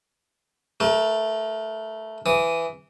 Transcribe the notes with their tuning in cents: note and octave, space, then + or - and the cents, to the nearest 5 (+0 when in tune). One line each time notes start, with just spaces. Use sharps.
A3 +0 A#4 +35
E3 +10 D#6 +0